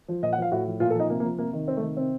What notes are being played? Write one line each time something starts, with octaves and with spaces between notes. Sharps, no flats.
F3
A#2 D#5
F#5
F3 F5
A2 F#4
F3
A#2 F4
A4
F3 D#4
C3 A#3
A#3
F3
C3 A#3
D#3
C3 C4
A3
D#3
C3 C4